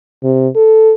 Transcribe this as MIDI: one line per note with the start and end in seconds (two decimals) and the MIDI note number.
0.23 0.48 48
0.55 0.94 69